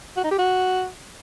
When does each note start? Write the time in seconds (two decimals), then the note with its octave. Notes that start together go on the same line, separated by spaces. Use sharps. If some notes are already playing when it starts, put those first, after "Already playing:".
0.17 F#4
0.24 D#4
0.31 G4
0.38 F#4